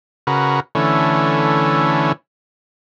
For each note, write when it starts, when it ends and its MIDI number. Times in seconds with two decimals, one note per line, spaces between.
0.27 0.60 49
0.27 0.60 66
0.27 0.60 70
0.27 0.60 71
0.75 2.12 50
0.75 2.12 52
0.75 2.12 57
0.75 2.12 61